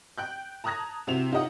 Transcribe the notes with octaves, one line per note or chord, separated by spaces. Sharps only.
G5 F#6 G6
A5 A#5 D#6 F#6 G#6 A#6
C3 C4 E4 F#4 E7 F7
D#4 F4 G4 D#5 F#5